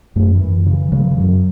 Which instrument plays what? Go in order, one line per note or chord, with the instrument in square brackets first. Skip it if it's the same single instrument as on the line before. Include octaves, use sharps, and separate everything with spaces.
[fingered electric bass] F#2 A3
E3
F#2
C#3
E3
C#3 G#3
F#3
E3
F#2 F#3